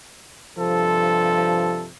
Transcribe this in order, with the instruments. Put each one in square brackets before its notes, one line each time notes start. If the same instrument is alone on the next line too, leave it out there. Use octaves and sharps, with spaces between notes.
[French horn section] G2 C3 F3 [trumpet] A4